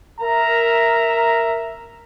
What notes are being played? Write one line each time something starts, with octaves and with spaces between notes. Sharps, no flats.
A#4 E5 A#5